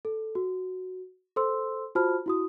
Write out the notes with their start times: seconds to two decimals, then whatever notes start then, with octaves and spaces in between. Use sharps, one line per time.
0.05 A4
0.35 F#4
1.36 A4 C5 C6 E6
1.95 F4 F#4 C5 A5 B5 F6
2.26 E4 F#4 D#6